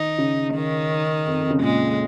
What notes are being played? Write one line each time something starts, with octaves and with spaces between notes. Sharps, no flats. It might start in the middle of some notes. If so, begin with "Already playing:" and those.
Already playing: D#3 D#4
C#3
D#3
F2
F2
C#3
A#2 G#3